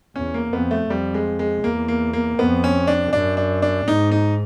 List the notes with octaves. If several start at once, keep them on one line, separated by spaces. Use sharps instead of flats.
E2 C#4
A#3
F2 B3
A3
F2 G3
G#3
G#3
E2 A#3
A#3
A#3
F2 B3
C#4
D4
F#2 D4
D4
D4
G#2 D#4
D#4